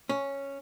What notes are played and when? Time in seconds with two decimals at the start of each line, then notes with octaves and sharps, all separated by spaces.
0.09 C#4